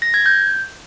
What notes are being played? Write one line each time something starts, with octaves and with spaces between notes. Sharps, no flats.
A#6
G#6
G6